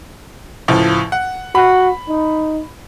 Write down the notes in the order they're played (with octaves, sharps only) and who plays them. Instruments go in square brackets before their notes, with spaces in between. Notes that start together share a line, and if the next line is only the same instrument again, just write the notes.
[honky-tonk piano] C#2 A2 F3
F#5
[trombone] F#4 [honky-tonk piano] B5
[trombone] D#4